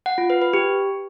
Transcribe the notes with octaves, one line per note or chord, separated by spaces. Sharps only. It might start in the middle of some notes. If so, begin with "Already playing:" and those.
F#5
F4
B4
B4
G4